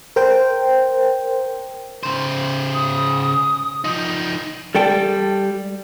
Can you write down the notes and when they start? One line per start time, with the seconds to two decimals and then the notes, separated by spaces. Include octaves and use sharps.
0.16 A#4 C5 G5
2.03 C#3 C5
2.74 D#6
3.84 F3 D#4
4.75 G3 A4 G5